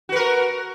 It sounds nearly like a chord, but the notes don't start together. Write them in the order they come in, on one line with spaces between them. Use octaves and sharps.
F#4 B4 A#4